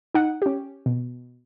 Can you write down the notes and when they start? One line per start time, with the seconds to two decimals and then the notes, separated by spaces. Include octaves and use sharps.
0.14 D#4 F#5
0.42 C#4 G4
0.86 B2